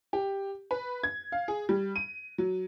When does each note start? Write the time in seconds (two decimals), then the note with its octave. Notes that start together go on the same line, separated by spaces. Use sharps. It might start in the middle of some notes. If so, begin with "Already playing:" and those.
0.13 G4
0.71 B4
1.03 G#6
1.32 F5
1.48 G#4
1.69 G3
1.96 D#7
2.38 F#3